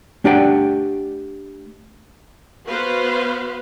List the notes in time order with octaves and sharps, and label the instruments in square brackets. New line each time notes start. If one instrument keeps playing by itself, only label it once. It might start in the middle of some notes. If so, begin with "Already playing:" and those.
[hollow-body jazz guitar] A3 D4 G4 D5 F#5 G5
[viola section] B3 F#4 B4 C5 F5